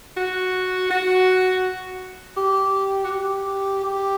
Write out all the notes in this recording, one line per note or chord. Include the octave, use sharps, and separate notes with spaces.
F#4
F#4
G4
F#4
G4
G4